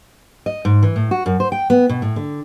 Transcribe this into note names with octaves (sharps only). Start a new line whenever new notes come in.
D#5
G#2
E3
A2
F#4
F#2
C5
G5
B3
B2
A2
D3